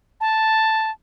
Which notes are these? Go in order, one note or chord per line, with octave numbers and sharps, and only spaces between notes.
A5